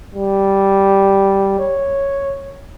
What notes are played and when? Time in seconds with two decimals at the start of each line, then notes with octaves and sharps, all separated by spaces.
0.15 G3
1.59 C#5